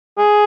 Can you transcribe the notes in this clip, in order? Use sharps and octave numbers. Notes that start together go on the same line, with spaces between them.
G#4